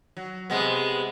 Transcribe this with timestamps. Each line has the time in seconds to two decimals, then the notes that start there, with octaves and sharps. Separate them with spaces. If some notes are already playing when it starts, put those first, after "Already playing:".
0.17 F#3
0.50 C3 G#3 B3